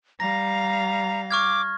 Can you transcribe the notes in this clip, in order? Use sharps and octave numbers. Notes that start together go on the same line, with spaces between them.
G3 F5 A#5 A#6
C#6 D6 F6 G#6